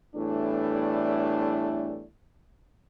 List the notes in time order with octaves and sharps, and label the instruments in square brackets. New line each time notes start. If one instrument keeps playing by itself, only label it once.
[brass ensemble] E2 A2 E3 G3 A3 D4